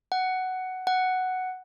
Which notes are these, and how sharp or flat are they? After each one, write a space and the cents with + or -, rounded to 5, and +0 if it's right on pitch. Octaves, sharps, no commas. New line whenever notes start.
F#5 +10
F#5 +5